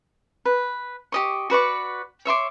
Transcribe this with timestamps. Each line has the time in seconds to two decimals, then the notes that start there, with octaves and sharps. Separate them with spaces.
0.45 B4
1.12 G4 D#5 C#6
1.50 F#4 B4 D5 C#6
2.25 C#5 E5 C6 D6